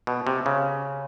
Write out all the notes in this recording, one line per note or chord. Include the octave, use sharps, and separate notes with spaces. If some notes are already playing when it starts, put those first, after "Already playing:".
B2
C3
C#3